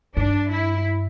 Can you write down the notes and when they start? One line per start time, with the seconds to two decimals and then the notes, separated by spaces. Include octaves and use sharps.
0.16 G2 D4
0.51 E4